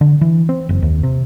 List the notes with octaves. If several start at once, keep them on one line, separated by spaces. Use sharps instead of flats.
D3
E3
C4
F#1
D#2
C3